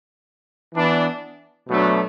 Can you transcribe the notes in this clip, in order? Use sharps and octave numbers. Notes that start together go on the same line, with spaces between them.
E3 B3 D4
B2 F#3 A3 D4